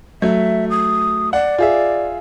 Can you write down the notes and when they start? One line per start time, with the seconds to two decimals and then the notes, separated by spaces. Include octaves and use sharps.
0.22 F#3 A3 E5
0.70 D#6
1.33 D5 F#5
1.58 F4 G#4 E5